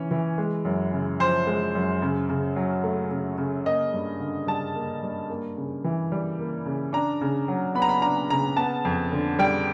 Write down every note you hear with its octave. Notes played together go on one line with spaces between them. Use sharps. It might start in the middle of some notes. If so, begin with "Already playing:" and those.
Already playing: E3 C#4
E3
G#3
F#2
C#3
F3 C5
G#3
F#2
C#3
C#3
F#3
A3
C#3
C#3
A#3 D#5
G2
D3
G3 A5
A#3
G2
A#3
C#3
E3
G3
A#3
C#3
D4 A#5
C#3
F#3
B3 B5
A#5
B5
D4 A#5
C#3 A#5
B3 A5
F2
D3
G3 G5